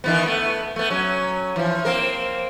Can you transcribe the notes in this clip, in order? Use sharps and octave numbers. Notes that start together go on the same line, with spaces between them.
D#3 E3 B3
A3 B3
A3 B3
F#3 C#4
E3 F3
A#3 C4 A#4